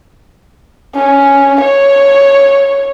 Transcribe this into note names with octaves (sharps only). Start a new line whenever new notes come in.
C#4
C#5